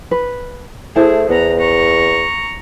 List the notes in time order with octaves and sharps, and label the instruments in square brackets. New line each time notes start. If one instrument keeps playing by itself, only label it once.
[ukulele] B4
[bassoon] A3 [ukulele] E4 C5 A5 [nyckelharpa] G#4
[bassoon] E2 [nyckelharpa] B3 A#5
[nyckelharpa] A#5 C#6